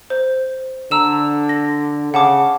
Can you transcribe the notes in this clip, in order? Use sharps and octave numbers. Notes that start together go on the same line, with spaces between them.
C5
D3 A#5 E6 E7
A#6
C#3 F#5 A5 D6